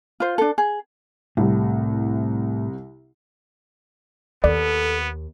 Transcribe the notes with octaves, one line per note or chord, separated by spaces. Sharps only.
F4 C5
D4 A4
G#4
C2 A2 C3
D#2 B3 A4 D5